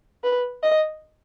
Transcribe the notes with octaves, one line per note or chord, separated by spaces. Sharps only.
B4
D#5